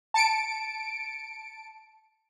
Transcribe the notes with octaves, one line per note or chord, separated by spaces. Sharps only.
A5 C#7 D7